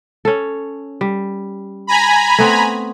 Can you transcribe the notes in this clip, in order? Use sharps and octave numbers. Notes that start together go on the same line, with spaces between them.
C#4 A4
G3
G#5 A#5 B5
A3 B3 C4